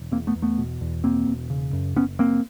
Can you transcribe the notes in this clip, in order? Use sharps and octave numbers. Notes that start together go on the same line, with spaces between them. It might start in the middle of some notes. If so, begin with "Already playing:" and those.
Already playing: E1
E2 A#3 C4
A3 B3
E2
A3 B3
B2
E2
B2 A#3 C4
E1
C#3
F#2
F#1 B3 C#4
F#1 A#3 C4